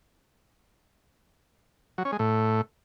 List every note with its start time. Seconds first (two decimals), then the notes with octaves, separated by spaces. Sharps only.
1.98 F#3
2.05 C#4
2.12 G#3
2.19 A2